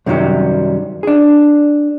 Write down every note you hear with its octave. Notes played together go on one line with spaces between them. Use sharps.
F#2 C3 D#3 E3 F#3 G3
D4 G#4